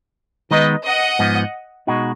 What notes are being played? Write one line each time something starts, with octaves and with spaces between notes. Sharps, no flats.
D#3 G#3 B3 D#4 B4 D#5
D#5 F#5
G#2 F3 B3
B2 G#3 D#4 F#4